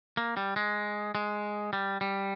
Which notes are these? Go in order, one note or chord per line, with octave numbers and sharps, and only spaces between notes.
A#3
G3
G#3
G#3
G3
G3